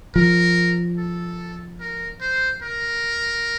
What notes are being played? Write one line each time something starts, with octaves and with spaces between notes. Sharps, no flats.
F3 A#4
A4
A#4
C5
A#4